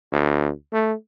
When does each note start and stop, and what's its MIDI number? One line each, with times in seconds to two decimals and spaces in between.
0.12 0.51 38
0.73 0.93 57